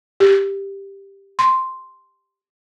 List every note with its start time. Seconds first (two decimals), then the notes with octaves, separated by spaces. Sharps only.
0.20 G4
1.39 C6